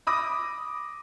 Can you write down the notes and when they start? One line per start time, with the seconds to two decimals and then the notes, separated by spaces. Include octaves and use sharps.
0.07 B5 D6 D#6 A#6